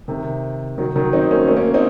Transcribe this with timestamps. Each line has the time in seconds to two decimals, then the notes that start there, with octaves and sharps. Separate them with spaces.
0.08 C3 D#3
0.78 D#3 F#3
0.96 D#3 F#3
1.13 C4 D#4
1.31 A#3 C#4
1.48 A3 C4
1.57 A#3 C#4
1.74 C4 D#4